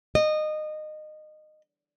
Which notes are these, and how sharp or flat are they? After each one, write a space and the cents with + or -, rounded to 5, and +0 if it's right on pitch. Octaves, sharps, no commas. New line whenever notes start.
D#5 -20